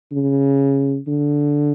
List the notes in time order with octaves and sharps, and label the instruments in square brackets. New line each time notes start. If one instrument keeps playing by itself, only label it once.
[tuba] C#3
D3